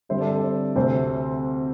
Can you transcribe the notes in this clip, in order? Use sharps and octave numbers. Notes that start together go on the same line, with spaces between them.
G2 D3 G3 C4 C5 E5
A4 D5
A4
D5
C5
D2 C3 A3 C4 C5